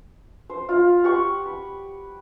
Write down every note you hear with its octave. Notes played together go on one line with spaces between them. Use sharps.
C5
F4
G4 F#5 C#6
B5